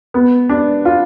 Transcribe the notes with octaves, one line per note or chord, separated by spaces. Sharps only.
B3
D4
F4